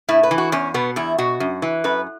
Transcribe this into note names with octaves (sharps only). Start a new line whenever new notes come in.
A2 E4
B4
E3
F#4
E2 C#4
B2 B3
E2 E4
B2 F#4
F#2
E3
F#2 B4